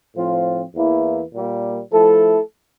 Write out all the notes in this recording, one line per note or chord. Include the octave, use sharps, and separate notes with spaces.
A2 F3 C4 F4
E2 E3 A#3 E4
A#2 G3 A#3
F3 A3 E4 A4